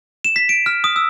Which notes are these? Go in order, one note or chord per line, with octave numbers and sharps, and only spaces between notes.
E7
B6
D7
F6
D#6
E6